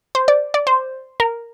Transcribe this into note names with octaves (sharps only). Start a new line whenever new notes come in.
C5
D5
D5
C5
A#4